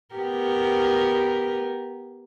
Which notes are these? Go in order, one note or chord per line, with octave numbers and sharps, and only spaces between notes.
B3 G4 A#4